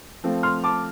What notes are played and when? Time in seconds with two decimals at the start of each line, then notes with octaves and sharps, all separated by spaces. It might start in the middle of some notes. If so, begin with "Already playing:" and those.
0.24 F3 A3 C4
0.43 C6 F6
0.64 A5 D6